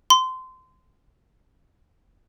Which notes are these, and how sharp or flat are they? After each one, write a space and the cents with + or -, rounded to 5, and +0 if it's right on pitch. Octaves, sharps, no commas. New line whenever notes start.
C6 -20